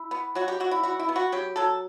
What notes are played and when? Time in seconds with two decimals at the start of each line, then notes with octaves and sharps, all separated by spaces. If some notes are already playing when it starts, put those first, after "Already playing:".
Already playing: E4
0.11 B3
0.35 F#3 F#4
0.48 G4
0.60 F#3 F#4
0.71 E4
0.83 E4 F#4
1.00 E4
1.09 B3
1.16 F#4
1.32 F#3 G4
1.56 F#3 A4